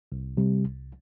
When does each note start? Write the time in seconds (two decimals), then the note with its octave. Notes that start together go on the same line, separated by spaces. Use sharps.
0.12 C2
0.37 C3 G3
0.65 C2